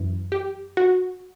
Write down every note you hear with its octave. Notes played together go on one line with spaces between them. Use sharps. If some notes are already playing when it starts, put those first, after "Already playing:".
Already playing: F#2 E3
G4
F#4